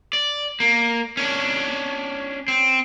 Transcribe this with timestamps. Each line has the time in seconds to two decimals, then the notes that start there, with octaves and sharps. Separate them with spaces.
0.13 D5
0.60 A#3
1.17 C#4 D4
2.48 C4